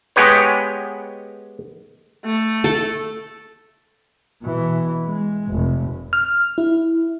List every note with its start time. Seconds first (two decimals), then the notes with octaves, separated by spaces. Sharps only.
0.16 G#3 B3 G4 B4 C#5
2.25 A3
2.64 A4
4.42 B2 E3
5.06 G#3
5.47 F1
6.13 F6
6.58 E4